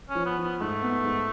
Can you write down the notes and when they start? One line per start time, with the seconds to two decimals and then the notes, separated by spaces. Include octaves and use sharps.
0.10 C#4
0.15 F3
0.26 B3
0.38 F3
0.43 B3
0.60 G#2 A3
0.82 B3
1.04 G#2